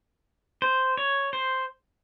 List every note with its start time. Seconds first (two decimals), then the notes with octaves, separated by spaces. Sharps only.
0.62 C5
0.97 C#5
1.33 C5